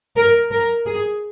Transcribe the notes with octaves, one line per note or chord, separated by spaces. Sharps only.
A#4
A#4
G#4